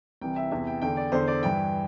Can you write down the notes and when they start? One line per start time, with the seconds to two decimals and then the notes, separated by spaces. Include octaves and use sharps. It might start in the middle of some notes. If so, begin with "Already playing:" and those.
0.21 C2 C3 E3 G5
0.36 E5
0.51 E2 C3 E3 E5
0.67 G5
0.81 E2 D3 G5
0.97 D5
1.12 E2 D3 C5
1.28 D5
1.42 G2 E3 G5